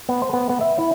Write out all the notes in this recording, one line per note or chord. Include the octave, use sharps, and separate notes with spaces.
B3
C5
B3
B3
E5
E4